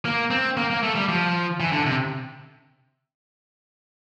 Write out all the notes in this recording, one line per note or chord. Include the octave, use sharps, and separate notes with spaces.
A#3
C4
A#3
A#3
A3
G3
F3
E3
D3
C3